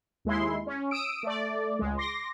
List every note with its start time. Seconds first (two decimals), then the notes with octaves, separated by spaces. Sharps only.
0.25 D#2 G#3 E4 C6
0.67 C#4
0.91 D#6 E6 D7
1.23 A3 D5
1.79 C#2 G#3
1.98 C6 D6 A#6